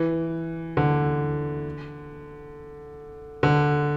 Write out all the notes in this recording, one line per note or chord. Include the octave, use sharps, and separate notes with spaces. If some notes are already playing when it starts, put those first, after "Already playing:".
Already playing: E3
D3
D3